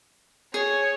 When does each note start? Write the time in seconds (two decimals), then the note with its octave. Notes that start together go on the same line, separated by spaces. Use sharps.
0.54 G#4 C#5